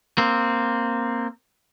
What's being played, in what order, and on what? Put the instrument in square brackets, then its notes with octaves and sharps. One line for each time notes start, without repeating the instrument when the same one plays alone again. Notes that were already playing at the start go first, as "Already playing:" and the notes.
[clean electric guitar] A#3 C4